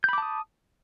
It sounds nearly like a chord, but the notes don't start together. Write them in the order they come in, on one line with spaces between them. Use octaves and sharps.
G6 B5 D6 A5 D#6